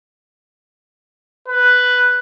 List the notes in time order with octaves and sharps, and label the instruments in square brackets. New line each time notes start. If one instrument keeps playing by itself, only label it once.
[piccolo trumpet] B4